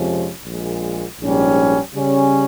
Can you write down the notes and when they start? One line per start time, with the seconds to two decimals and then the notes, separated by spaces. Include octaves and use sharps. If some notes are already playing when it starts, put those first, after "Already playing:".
Already playing: F2 C3 F3 G#3 C#4
0.45 A#1 A#2 G#3
1.20 A#1 G#2 G3 C#4
1.94 C#3 G3 C#4